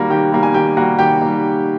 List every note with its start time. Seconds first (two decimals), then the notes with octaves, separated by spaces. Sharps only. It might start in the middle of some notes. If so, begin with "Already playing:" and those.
Already playing: D#3 G3 A#3 F#4
0.10 D#3 G4 G5
0.32 G3 A#3
0.43 G#5
0.54 D#3 G4 G5
0.77 G3 A#3 F#4 F#5
0.99 D#3 G4 G5
1.22 G3 A#3